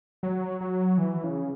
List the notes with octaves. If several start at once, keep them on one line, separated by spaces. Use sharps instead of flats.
F#3
F#3
E3
C#3